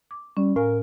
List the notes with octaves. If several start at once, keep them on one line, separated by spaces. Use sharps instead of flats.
D6
G3 C#4
A2 A#4 F5 G#5